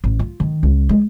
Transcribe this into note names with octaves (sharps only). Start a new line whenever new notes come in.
A1
F4
D#3
C#2
G#3